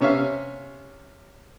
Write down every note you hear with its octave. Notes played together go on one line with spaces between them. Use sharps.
C3 C#4 C#5 E5 F5